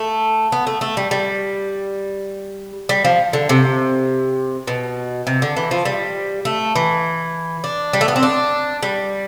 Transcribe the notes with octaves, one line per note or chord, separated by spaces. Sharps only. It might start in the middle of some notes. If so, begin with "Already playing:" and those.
Already playing: A3
B3
A3
A3
G3
G3
G3
F3
D3
C3
B2
C3
D3
E3
F3
G3
A3
E3
D4
G3
A3
B3
C4
D4
G3